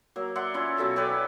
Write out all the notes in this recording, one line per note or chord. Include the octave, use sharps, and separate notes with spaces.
F#3 A#3
D5 E5 F#5 C6
C#4 E4 F4
B2 F#3 A4 E5
C#4 G4 B4 D5